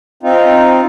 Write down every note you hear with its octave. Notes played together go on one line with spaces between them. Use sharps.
C4 D#4 F4